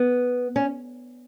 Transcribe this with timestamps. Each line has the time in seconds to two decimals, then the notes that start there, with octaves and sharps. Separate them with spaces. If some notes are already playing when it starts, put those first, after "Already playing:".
Already playing: B3
0.56 C#4